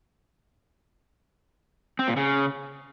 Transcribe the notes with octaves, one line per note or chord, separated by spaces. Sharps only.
C4
A#2
C#3